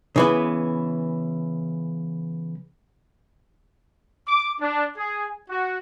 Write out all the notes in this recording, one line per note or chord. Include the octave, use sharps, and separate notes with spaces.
C#3 E3 B3
D6
D4
G#4
F#4